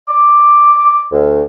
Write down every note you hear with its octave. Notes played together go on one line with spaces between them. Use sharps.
D6
D2